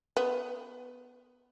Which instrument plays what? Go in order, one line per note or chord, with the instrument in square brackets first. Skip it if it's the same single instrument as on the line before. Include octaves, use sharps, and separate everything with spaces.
[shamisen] B3